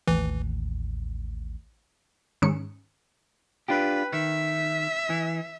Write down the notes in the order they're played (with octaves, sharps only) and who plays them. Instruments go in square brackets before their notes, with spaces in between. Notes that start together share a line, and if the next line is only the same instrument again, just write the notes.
[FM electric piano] A1 D#2 A2 [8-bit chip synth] E3
[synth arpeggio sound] G#2 D#3 C#4 C#7
[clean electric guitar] D4 F4 G4 [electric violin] B4
[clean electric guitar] D#3 [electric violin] E5
[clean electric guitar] E3